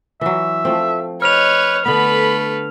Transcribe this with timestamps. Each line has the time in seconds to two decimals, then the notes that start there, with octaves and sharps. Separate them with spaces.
0.21 E3 F#3 E5
0.65 F3 A3 C4
1.22 B4 C#5 D#5 F6 F7
1.86 D3 A3 B3 B4 B5